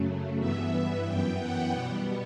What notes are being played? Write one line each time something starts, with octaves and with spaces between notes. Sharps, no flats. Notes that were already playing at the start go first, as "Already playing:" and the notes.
Already playing: F#2 C#3 F#3 A3
G2 E3 B3 E5
F#2 E3 B3 G5
F#5
B2 G3 B3